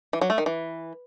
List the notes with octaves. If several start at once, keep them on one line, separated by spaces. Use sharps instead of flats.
E3
F#3
A3
D#3
E3